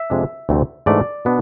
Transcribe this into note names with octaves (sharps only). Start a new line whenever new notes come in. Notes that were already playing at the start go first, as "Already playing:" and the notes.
Already playing: E5
F2 C3 G#3 D4
D2 C3 E3 A3 C4
G#2 E3 A3 D4 D5
B2 B3 D4